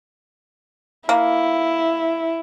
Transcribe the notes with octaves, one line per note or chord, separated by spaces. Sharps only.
A#3 E4